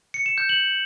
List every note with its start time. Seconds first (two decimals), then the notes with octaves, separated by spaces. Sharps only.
0.14 C#7
0.26 E7
0.38 G6
0.49 F#7